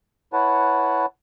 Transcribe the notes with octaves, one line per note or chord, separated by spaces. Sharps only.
E4 B4 C#5 F#5 A5